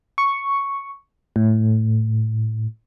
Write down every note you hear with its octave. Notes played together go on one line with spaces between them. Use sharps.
C#6
A2